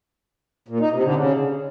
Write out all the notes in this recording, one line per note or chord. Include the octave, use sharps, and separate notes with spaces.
A#2
D#4
C3
D3
C#3